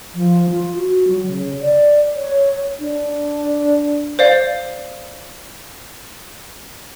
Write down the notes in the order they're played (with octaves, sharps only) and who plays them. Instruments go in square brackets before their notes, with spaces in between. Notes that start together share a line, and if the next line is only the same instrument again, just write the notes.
[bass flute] F3
F4
F#4
F#3
C#3
D5
C#5
[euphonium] D4
[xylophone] C5 D5 F5